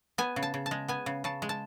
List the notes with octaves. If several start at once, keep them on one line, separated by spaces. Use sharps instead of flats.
B3 G#5
C#3
A5
C#3
A5
G#3
B3 G#5
C#3
C#3 A5
G#3
A5